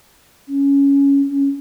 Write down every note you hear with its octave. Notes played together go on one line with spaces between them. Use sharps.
C#4
C#4